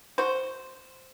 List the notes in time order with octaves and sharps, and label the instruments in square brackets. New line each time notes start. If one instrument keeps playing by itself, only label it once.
[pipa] F#4 C5